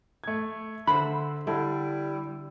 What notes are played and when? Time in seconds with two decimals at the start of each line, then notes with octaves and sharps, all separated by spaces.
0.24 A3 G#6
0.87 D3 C5 E5 F#5 B5
1.47 D3 G3 E4